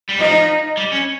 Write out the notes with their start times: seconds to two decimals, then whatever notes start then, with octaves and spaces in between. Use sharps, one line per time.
0.09 G3
0.19 F3 D#4
0.77 G3
0.92 C#4